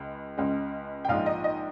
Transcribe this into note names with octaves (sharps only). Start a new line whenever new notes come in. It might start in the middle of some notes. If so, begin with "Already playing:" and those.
Already playing: C#2 G#3
C#2 C#3 G#3
G5
A#1 G#2 F3 G#3 F5
D#5
D#5